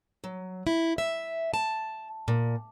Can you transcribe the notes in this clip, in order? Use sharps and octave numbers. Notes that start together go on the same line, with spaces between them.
F#3
E4
E5
A5
A#2